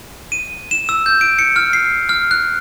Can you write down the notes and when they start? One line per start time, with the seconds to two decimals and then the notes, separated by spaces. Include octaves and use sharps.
0.32 D#7
0.71 E7
0.89 E6
1.06 G6
1.21 D7
1.39 C#7
1.56 F6
1.73 C7
2.09 F6
2.31 F#6